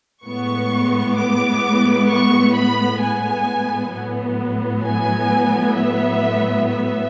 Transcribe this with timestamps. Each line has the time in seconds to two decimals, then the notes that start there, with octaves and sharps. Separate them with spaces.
0.24 A2 G#3 B3 C#6
1.17 D6
2.08 C#6
2.55 B5
3.01 G#5
3.93 A2 F#3 B3
4.85 G#5
5.77 E5
6.69 E5